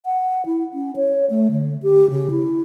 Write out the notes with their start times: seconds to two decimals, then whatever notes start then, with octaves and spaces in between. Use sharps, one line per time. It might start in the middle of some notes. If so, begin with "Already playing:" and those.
0.06 F#5
0.46 E4
0.74 C#4
0.96 C#5
1.30 A3
1.51 D3
1.83 G4
2.10 C#3
2.30 E4